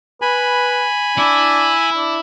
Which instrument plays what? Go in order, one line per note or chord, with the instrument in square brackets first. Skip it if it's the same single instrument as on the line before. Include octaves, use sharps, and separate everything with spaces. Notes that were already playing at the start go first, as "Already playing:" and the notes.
[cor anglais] B4 [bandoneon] G#5 B5
[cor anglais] D4 [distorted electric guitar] E4
[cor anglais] D4